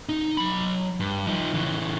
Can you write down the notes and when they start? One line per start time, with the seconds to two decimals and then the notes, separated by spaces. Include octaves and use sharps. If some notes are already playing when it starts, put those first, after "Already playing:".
0.09 D#4
0.37 F#3 B5
1.00 G2
1.27 F3 D#4
1.54 C#3 E3